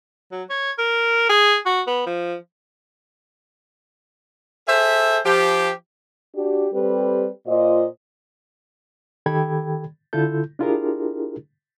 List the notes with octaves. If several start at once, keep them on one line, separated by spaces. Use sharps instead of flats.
F#3
C#5
A#4
G#4
F#4
B3
F3
G#4 A4 C5 E5
F3 G4
D4 F#4 G4
G3 C4 G4 A4 B4
A#2 F4 C5 D#5
D#3 G4 A4 G5 B5 G#6
D3 E4 F4 A4 G6
D4 E4 F4 G4 G#4 A#4